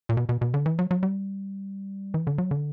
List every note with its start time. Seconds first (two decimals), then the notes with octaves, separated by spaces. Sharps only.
0.09 A#2
0.17 B2
0.29 B2
0.41 B2
0.54 D3
0.66 E3
0.79 F#3
0.91 F#3
1.03 G3
2.14 E3
2.27 D3
2.38 F#3
2.51 D3